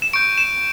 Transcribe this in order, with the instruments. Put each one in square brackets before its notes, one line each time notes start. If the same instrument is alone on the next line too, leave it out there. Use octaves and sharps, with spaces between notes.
[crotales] E7
C#6 G6 D7
E7